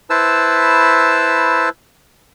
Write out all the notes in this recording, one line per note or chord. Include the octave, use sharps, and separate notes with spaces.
E4 B4 C5 A5 E6